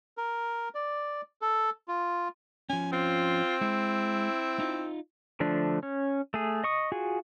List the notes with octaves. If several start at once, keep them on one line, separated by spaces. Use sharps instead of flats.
A#4
D5
A4
F4
F3 C#4 G#5
C4 F4
G#3 E4
D#4 F4
D3 F3 A3 D4
C#4
A3 G#4
D#5 C#6 D#6
F4 F#4 G#4